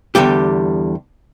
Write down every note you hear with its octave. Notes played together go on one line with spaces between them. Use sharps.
E2 D3 G3 G4